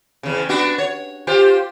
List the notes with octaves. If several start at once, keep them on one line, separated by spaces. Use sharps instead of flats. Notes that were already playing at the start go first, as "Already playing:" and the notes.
E2 C#3
B3 D4 F#4
C#5
F4 G4 C5